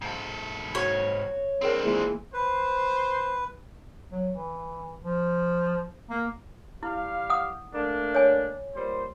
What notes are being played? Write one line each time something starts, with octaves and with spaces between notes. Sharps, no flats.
G#2 A4
F#4 C#5
C4 D4 G#4 A#4 G5
A#2 E3 G#3
B4 C5
F#3
E3
F3
A#3
G3 E4 G4 F5
F#5 D#6
A3 A#3 D4
C#5 G#5
A#2 G3 C5